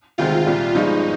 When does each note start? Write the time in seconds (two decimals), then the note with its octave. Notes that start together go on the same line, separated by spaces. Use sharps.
0.18 D2 C3 D#3 G#3 C4 F4
0.46 C2 A#2 G3
0.74 G1 G2 F3 G#3 D#4